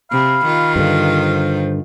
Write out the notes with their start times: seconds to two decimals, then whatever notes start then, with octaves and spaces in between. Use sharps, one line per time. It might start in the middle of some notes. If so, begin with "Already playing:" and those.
0.11 C3 F5 B5
0.45 D#3 F4
0.76 G2 D3 B4
1.19 C5